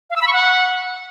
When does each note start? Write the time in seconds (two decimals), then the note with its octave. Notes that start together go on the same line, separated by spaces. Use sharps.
0.10 F5
0.16 E6
0.22 B5
0.27 C#6
0.33 F#5